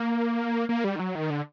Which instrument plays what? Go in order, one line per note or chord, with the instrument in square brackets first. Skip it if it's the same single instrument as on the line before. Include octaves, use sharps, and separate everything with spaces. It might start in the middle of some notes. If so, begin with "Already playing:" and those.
Already playing: [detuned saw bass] A#3
A#3
G3
D#3
F#3
D#3
D3